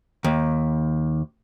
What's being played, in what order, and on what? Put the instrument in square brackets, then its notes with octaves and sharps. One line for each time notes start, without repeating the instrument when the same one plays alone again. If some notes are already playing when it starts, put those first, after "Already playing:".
[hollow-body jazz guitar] D#2